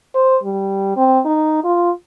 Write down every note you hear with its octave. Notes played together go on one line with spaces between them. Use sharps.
C5
G3
C4
D#4
F4